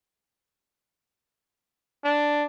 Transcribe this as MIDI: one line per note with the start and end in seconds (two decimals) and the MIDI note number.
2.04 2.46 62